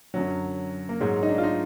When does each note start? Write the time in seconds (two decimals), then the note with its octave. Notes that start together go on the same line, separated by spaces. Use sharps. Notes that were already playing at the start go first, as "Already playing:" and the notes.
0.14 F#2 D3 F#3
0.89 A#3
1.00 G#2 F#3 G#3
1.23 D#4
1.29 D4
1.38 F4
1.44 D#4